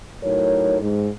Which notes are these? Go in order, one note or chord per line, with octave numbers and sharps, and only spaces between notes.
A2 F#3 D#4 A#4 C#5
G#2